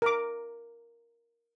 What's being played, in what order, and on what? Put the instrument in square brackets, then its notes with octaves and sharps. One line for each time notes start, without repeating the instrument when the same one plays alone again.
[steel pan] A#4 D6